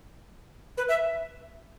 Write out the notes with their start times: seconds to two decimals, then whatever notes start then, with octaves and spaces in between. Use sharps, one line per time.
0.78 B4
0.89 E5